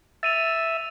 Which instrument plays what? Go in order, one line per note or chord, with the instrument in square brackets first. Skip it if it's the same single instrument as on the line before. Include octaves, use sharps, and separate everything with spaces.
[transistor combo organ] E5 [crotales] A6 D#7 F7